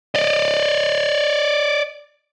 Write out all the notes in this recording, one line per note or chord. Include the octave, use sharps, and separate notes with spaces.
D5 D#5